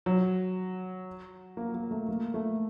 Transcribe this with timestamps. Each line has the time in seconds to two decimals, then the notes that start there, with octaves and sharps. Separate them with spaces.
0.06 F#3
1.57 A#3
1.75 A#3
1.91 A3
2.09 A#3
2.34 A3